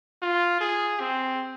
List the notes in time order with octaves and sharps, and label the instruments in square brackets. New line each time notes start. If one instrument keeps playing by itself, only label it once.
[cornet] F4
G#4
C4